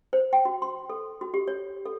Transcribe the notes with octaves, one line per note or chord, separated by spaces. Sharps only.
C5
G5
F#4
C6
A4
F#4
G4
C#5
A4